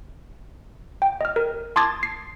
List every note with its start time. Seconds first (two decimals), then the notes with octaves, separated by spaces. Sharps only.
1.02 G5
1.21 D#5 F6
1.36 A#4
1.76 A5 C6 D6 D#6 G#6 A6
2.03 C7